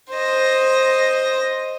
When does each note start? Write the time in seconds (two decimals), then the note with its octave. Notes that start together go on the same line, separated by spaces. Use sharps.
0.11 C5 D#5